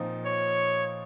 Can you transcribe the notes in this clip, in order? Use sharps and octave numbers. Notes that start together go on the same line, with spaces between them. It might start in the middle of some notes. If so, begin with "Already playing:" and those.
Already playing: A#2 F3 C4 D#4
C#5